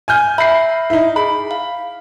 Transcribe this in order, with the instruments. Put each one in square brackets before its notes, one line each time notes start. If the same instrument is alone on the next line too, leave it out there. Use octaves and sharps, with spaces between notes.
[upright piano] G#5 F6 G6
[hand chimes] E5 [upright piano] B5 C7
[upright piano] D#4 E4
[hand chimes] G#4 [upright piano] B5
[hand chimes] F5